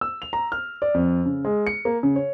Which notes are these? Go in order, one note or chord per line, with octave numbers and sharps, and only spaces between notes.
E6
F7
A#5
F6
D5
F2
C#3
G#3
C#7
A#3
C#3
C#5